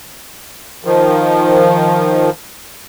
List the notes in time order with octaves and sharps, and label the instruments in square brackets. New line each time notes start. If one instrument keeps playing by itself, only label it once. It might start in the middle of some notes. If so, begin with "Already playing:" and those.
[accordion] D#3 F3